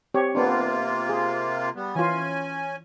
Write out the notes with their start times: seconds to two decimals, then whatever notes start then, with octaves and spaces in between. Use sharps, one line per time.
0.14 C4 G4 C#5
0.35 C3 A#3 B3 D4 F4
1.09 G#4
1.76 G3 B3
1.95 E3 C#4 F4 G#5